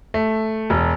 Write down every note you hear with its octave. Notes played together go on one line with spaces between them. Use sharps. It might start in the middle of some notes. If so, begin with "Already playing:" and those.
A3
E1